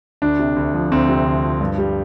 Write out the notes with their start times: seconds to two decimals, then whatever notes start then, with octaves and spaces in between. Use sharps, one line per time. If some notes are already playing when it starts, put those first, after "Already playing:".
0.22 D2 D4
0.39 C3
0.56 D2
0.74 F3
0.92 D2 C4
1.09 C3
1.26 D2
1.43 F3
1.61 G2
1.78 G3